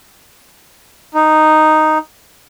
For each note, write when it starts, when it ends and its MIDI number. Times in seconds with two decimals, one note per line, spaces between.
1.14 1.98 63